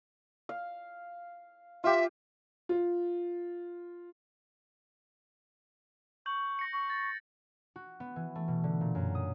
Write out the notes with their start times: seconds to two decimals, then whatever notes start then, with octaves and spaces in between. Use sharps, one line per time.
0.49 F5
1.84 F4 G4 E5
2.69 F4
6.26 C#6 G6 F#7
6.59 A#6 C#7
6.73 C#6
6.90 A6
7.76 F#4
8.00 B3
8.16 E3
8.35 A3
8.48 B2
8.64 D3
8.81 A#2
8.95 F#2
9.15 D#6